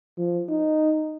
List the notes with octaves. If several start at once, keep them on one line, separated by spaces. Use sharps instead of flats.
F3
D#4